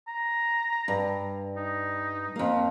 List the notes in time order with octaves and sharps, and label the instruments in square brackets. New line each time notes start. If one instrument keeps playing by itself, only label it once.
[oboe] A#5
[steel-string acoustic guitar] G2
[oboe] D#4
[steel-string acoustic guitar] F2 A#3